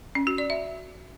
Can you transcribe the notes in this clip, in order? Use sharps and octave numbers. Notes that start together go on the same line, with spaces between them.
C#4
F#4
D5
E5